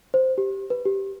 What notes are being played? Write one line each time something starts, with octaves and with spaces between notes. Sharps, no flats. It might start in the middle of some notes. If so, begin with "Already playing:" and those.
C5
G4
B4
G4